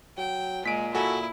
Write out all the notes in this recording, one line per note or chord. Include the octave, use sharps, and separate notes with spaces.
F#3 G5
A#2 G#3 B6 D7
E4 F#4 A4 G#5